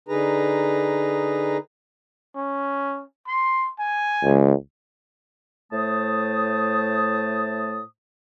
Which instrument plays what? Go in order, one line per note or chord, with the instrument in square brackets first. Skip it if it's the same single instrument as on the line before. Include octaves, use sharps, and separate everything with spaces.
[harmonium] D3 D#4 G#4 B4 A#5
[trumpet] C#4
C6
G#5
[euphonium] C#2
[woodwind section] A2 A3 C5 A5 D#6